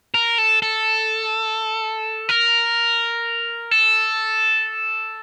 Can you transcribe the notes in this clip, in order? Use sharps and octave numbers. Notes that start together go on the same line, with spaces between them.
A#4
A4
A4
A#4
A4